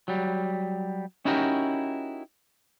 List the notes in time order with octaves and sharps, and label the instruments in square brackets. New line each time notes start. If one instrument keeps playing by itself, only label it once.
[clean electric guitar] F#3 G3
C#4 D#4 E4 F#4 G4 A#4